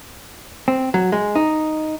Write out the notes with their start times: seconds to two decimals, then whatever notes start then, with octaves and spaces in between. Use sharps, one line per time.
0.68 C4
0.94 F#3
1.12 G#3
1.35 D#4